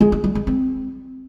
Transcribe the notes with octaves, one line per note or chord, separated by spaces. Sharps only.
G#3
D#4
G3
G#3
C4